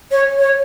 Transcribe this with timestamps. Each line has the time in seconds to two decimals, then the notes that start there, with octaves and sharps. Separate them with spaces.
0.11 C#5
0.39 C#5